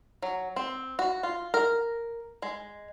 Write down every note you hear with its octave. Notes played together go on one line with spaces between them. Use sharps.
F#3
C4
F#4
F4
A#4
G#3